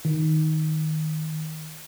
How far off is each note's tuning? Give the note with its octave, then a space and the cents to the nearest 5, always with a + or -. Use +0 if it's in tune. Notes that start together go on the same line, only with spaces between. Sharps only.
D#3 +5